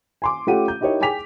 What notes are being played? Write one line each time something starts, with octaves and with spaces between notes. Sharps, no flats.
G#5 C6 D6
A3 C#4 F4 G4 F#5 D#7
G6
D#4 E4 G4 A#4 C#5 D#5
G#4 G5 G#5 D6 B6 F7